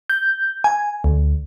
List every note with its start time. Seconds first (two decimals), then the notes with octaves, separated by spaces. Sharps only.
0.10 G6
0.64 G#5
1.04 D2